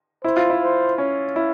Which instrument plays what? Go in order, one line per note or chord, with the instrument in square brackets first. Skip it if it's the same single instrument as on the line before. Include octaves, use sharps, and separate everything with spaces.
[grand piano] E4 [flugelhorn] C5
[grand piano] F4
E4
[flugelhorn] C5
[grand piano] C#4
E4